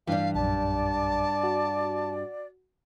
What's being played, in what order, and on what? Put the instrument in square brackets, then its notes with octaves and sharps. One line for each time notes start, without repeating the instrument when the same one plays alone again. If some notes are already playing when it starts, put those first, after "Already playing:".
[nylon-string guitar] G2 G3 [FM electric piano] E3 [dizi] F5
[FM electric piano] A#1 F#2 [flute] D5 [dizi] A5
[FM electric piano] F#4